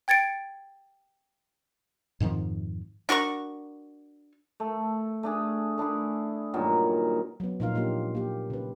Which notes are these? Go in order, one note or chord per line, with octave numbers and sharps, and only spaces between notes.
G5 G#6 A6 C#7 D7
F2 G#2 D#3 F3
D4 F#4 A#4 C#6
A3 A4
A3 D4 G#4
A3 D4 E4 G#4
G2 A#2 D#3 F#3
F#3 B3
A#2 F3 D#4 F4 A#4 F5
G#3 A#3 D4 F4 G4
A#3 G4
C#3 B4